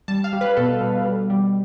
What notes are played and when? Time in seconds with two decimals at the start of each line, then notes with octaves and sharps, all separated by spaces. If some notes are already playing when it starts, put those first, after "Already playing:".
0.08 G3 A5
0.24 F5
0.33 G3
0.41 B4
0.57 B2 A4
0.81 B2
1.06 G3
1.30 G3